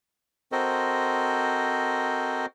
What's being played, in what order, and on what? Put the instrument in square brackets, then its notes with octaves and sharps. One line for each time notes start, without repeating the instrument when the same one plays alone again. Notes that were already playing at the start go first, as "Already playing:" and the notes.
[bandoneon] C4 F#4 A4 A#4 C5 D#5